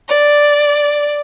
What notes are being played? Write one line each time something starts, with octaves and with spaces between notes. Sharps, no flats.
D5